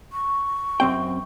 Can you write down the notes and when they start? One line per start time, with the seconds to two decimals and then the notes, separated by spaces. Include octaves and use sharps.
0.12 C#6
0.80 F#2 C4 G5